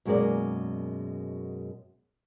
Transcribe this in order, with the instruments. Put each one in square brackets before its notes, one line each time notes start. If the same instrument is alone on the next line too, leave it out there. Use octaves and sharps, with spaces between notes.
[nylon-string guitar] F#2 B2 G#3 A#3 A#4 D5